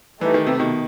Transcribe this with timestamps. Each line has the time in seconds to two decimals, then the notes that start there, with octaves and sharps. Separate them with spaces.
0.21 E3 A3 D#4 G4 B4
0.34 D#3
0.46 C3
0.60 B2 D#3